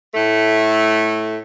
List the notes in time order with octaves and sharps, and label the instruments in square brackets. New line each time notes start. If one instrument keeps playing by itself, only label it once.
[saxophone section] A2 A3